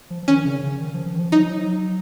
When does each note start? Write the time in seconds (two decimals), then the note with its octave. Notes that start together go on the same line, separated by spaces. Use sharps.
0.10 F3
0.22 F3
0.28 D#3 C#4
0.45 C#3
0.63 C#3
0.80 D#3
0.94 F3
1.06 F3
1.15 D#3
1.19 F3
1.32 F#3 D#4
1.42 F3
1.51 F#3